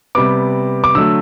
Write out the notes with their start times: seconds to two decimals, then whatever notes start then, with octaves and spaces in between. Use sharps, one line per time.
0.15 C3 G3 B3 D6
0.84 D6
0.95 D3 F#3 A3 E6